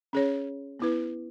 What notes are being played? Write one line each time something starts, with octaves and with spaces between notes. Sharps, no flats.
C#4 G#4 C#5
B3 E4 B4